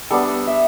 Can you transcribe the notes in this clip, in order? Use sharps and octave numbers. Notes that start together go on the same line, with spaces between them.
G3 B3 D4 A4
E5